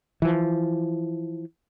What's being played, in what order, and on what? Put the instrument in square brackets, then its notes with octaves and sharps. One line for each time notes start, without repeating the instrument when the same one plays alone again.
[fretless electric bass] E3 F3